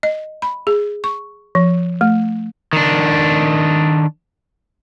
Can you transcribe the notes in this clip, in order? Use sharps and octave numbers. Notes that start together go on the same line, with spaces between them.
D#5
B5
G#4
C#6
F3
A3
D#3 D4